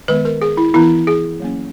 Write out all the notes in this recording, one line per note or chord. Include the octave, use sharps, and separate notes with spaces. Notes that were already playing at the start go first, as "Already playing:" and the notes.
D#3 G#3 B3 B4
A#4
G#4
E4
E3 B3 E4
G#4
F#3 A#3 C#4